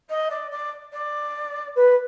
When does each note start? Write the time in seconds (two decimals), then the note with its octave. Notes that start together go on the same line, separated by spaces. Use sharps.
0.09 D#5
0.30 D5
0.51 D5
0.92 D5
1.75 B4